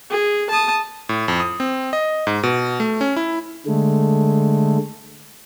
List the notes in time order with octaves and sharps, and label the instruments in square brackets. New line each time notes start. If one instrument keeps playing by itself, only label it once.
[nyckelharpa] G#4
A5 D#6
[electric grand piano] A2
F2
D#6
C4
D#5
G#2
B2
A3
C#4
E4
[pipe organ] D3 G#3 A3